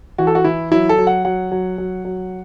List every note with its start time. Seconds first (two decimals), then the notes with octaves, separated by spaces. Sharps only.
0.18 E3 F#4
0.27 A4
0.35 F#4
0.44 E3 E4
0.72 F#3 E4
0.89 A4
0.98 F#3
1.07 F#5
1.25 F#3 F#5
1.52 F#3
1.78 F#3
2.05 F#3